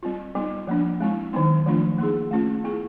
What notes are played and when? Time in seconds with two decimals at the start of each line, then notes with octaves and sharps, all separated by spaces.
0.03 G3 C4 F4
0.35 G3 B3 D#4
0.67 F3 A#3 D4
1.01 G#3 C4 E4
1.33 D#3 F#3 B3 D#4
1.66 F3 A3 D4 F4
1.98 A#3 D#4 G#4
2.31 A3 C#4 F4
2.64 B3 E4 G#4